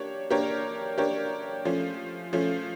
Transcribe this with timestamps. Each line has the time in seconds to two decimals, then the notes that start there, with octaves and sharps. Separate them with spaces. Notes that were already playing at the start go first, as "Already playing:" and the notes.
Already playing: A#3 D4 G4 C#5
0.30 A#3 D4 G4 A#4 C#5
0.98 A#3 D4 G4 A#4 C#5
1.65 F3 A3 C#4
2.33 F3 A3 C#4